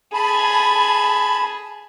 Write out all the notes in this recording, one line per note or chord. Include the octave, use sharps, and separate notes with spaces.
G#4 A5 B5